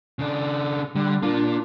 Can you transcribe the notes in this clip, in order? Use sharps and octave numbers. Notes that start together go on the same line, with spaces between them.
C#3 D4
D3 G3
A#3 D4 F4